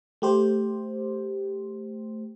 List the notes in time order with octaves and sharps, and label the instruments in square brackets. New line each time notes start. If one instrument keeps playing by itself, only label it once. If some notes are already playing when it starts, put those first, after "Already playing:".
[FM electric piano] A3 G4 C5